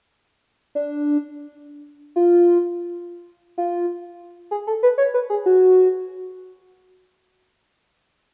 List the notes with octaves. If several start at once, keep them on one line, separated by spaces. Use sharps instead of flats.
D4
F4
F4
G#4
A4
B4
C#5
B4
G#4
F#4